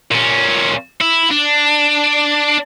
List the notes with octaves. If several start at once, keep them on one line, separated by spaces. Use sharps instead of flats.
A#2 C#4
E4
D4